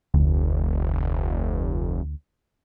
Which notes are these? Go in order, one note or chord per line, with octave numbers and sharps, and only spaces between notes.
F1 D2